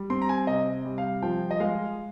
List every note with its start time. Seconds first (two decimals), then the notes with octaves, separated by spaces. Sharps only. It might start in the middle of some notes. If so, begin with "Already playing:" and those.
Already playing: G3
0.10 C4 C6
0.22 A#5
0.29 G#5
0.47 C3 D#5
0.85 G3
0.98 F5
1.22 F3 G5
1.51 D#5
1.60 G#3 F5